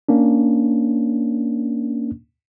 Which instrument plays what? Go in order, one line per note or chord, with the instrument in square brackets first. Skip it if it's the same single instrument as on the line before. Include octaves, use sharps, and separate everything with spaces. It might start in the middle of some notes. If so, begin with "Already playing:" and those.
[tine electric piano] A#3 C#4 D4